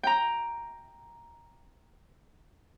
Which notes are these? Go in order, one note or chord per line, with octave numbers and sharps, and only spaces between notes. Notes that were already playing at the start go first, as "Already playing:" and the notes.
G5 A#5